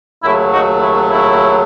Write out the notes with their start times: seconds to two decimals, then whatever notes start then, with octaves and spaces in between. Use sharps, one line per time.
0.23 D#2 C#3 F#3 A3 E4
0.52 D#4 F#4
0.80 E4
1.10 E4